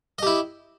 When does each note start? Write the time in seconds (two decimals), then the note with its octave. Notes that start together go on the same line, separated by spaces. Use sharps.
0.18 D#5
0.23 G4
0.27 E4